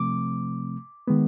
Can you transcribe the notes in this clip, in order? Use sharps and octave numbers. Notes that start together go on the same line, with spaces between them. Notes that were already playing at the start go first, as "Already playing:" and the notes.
Already playing: C3 F3 A3 C4 D6
D#3 G#3 B3